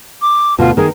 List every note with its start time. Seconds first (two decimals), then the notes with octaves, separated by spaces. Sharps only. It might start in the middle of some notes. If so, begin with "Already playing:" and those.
0.22 D6
0.58 D2 B2 F4
0.77 D#3 G#4 A#4